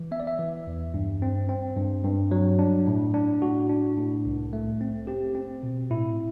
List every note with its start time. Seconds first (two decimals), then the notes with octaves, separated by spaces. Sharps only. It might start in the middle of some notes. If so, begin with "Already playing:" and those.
Already playing: E3
0.11 B3 E5
0.20 D5
0.27 E5
0.39 E3
0.67 E2
0.94 G2
1.22 C4
1.49 C4
1.76 G2
2.04 G2
2.31 F#3
2.59 D4
2.87 A2
3.14 D4
3.42 A2 F#4
3.69 D4
3.97 A2
4.25 C2
4.53 A3
4.81 C4
5.07 C4 G4
5.35 C4
5.63 B2
5.90 A2 E4